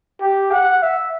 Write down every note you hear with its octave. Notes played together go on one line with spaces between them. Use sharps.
G4
F#5
E5